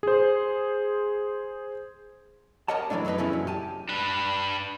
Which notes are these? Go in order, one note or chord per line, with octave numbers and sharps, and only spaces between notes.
G#4 C5
G4 A#4 C#5 D#5 F#5 A5
E3 F#3 G#3 A3 D4
F#2 F#3 B3 D#4 B4
C#3 E3 C#4 E4 A4
F#2 A#2 F#3
G4 G#5 A5
D4 B4